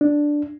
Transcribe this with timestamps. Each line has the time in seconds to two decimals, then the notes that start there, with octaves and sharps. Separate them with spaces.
0.01 D4